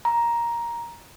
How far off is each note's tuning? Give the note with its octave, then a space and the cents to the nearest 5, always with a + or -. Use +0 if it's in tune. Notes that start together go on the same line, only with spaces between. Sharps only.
A#5 +10